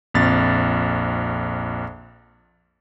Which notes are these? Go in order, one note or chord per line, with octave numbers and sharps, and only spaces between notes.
A#1 F2 A6